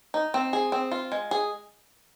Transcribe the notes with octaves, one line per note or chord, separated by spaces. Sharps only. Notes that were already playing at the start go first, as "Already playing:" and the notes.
D#4
C4
G#4
C4
F4
G#3
G#4